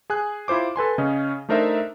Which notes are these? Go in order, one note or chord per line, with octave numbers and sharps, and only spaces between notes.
G#4 G#5 F#6
E4 F4 C5 D6
A4 B4 G#5 C6
C#3 C#4 D#5
A3 D4 D#4 A#4 C5 E5